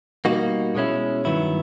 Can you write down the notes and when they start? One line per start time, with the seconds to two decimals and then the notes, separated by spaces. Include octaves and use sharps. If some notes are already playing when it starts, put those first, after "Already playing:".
0.25 B2 G3 A#3 D#4 F#4
0.75 B2 G#3 C#4 E4
1.25 G2 D#3 F#3 B3 E4